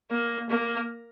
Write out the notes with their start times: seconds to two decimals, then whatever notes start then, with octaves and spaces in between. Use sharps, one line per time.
0.11 A#3
0.49 A#3